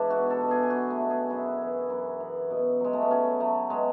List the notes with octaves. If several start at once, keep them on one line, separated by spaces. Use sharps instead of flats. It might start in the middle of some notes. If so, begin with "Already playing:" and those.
Already playing: G#2 E3 D4 E4
B2 F#4
A4
B2
G#4
G#4
F#3 F#4
A3
B2
G#4
F#2 E4
E3
F#2
E3
B2
F#3 G#3
A3
B3
F#3 C#4
F#3 A3
B2 G#3